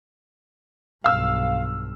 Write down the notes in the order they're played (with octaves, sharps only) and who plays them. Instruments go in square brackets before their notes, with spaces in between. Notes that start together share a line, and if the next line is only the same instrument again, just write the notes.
[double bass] B1 G2 [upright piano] F5 E6 F6